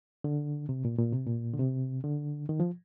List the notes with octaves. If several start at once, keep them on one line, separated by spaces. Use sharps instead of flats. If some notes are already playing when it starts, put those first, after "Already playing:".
D3
C3
A#2
A#2
C3
A#2
D3
C3
D3
D#3
F3